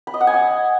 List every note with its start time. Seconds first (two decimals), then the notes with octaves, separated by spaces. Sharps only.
0.07 B5
0.14 D#5
0.20 F#5
0.27 G#5
0.34 D#5